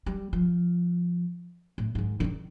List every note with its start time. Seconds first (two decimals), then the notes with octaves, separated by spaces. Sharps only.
0.06 G3
0.33 F3
1.78 A2
1.95 G#2 D#3
2.20 D3 D#3